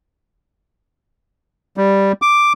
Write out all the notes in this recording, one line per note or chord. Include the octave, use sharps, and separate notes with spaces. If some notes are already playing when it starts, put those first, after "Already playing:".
G3
D6